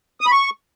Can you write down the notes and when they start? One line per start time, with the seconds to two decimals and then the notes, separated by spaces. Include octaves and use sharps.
0.21 D#6
0.26 B5
0.32 C#6